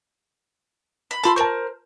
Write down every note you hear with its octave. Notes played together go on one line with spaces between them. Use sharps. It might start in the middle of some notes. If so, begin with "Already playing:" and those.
B5
F4 A4 A5 B5 C6
A#4 C5 A5 C#6